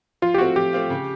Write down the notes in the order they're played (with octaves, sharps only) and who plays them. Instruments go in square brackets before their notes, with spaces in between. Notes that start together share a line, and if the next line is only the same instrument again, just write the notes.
[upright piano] F3 [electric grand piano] F4
[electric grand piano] G4
[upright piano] A3 C4 F4 [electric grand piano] F#4
[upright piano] F3 [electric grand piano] G4
[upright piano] A3 C4 F4
C#3